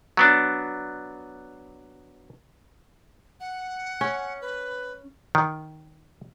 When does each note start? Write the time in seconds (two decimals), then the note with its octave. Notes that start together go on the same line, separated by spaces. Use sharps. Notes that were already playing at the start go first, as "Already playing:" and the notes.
0.17 F#3 B3 D4
3.40 F#5
4.01 C#4
4.41 B4
5.35 D#3